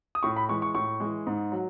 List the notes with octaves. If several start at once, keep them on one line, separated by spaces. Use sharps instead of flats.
D#6
A2 C#6
B5
E3 G#3 C#6
C#6
A2 C#6
E3 G#3
G#2
F#3